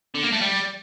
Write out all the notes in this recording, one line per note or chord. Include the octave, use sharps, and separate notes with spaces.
D3
A#3
A3
G3